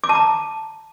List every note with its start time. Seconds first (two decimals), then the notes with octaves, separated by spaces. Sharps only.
0.04 D6
0.09 A5
0.15 A#5